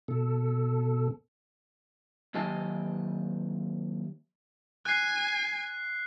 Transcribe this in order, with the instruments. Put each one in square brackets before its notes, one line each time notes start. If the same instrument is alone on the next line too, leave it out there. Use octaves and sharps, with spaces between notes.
[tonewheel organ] B2 A4
[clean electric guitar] D#2 F#3 G4 D#5 G#5 A5
[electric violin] G#5 [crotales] F#6 C7